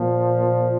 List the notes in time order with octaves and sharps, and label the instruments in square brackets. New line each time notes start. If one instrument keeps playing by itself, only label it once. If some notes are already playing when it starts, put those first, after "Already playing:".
Already playing: [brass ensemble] A#2 F3